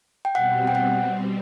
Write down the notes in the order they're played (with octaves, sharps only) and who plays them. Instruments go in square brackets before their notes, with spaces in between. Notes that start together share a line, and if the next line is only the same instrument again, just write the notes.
[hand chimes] G5
[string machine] B2 G3 C4 [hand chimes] F#5
[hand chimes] G5
F#5